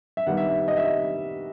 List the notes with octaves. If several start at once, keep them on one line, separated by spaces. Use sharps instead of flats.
E5
D#3 G3 B3 D#4 F#5
E5
E5
D#5
E5
D#5